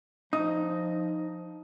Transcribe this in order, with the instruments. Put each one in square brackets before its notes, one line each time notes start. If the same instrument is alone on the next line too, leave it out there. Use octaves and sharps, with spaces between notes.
[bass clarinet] F3 [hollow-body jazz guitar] D#4 [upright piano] D#6